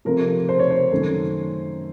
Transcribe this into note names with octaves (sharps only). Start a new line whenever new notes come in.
C3 F3 A3 A#4
C5
C#5
C5
F#2 D#3 A3 C#4